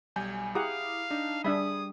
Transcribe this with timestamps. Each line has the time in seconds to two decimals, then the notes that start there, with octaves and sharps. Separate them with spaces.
0.16 B1 G3 G#5 G6
0.55 E4 G4 G#4 F5 F#5 A#5 D6 D#6
1.10 D4 D#4
1.44 G3 D4 G#4 E5 B5 D#6